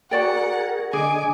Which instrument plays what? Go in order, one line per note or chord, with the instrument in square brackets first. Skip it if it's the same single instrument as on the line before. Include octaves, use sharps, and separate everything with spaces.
[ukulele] F#4 D5 G5 [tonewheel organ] G#4 A#4 [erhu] F#5
[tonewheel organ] D3 D#5 D6 [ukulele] G#4 [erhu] G#5